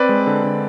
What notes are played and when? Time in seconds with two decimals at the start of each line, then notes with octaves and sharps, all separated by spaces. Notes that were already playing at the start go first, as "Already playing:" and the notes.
Already playing: C4 B4 D5
0.09 G#3
0.27 D3
0.44 D3